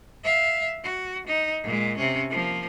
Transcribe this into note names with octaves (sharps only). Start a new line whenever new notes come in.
E5 F5
F#4
D#4
A#2 G#3
C3 C#4
F3 A#3